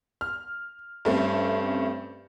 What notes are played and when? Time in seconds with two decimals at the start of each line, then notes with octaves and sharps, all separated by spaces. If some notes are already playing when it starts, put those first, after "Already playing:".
0.21 F6
1.05 G2 A3 C4 C#4